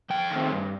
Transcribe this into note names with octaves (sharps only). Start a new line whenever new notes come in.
F2 G5
D#3 A3 C4
G2